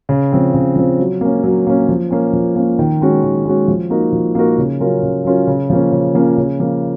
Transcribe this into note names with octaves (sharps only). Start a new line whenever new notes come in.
C#3
F3 C4
C#3
F3 C4
F#3
A#3 C#4
F#3
A#3 C#4
F3
A#3 C#4
F3
A#3 C#4
D#3
G#3 C#4 F#4
D#3
G#3 C#4 F#4
F3
A#3 D#4 F#4 A#4
F3
A#3 D#4 F#4 A#4
C#3
F#3 C#4 F4 A#4
C#3
F#3 C#4 F4 A#4
C#3
F3 A#3 C#4
C#3
F3 A#3 C#4
C#3
F3 A#3